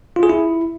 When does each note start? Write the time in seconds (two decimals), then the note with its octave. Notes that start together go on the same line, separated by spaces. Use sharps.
0.16 F4
0.23 G#4
0.29 E4